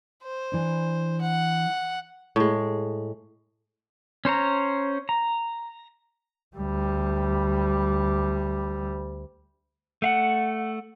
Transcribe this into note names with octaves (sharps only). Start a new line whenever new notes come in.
C5
E3 D4
F#5
A2 G#3
C#4 C5 C#5 A#5
A#5
D2 G3
A3 F5 F#5